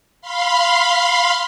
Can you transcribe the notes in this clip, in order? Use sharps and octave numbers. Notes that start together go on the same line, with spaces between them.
F5 B5 C6